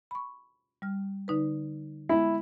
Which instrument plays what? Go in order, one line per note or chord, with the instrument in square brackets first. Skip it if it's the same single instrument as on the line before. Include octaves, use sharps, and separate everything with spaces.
[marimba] B5 C#6
G3 F6
D3 D#4 B4
[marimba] G#3 B3 [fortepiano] E4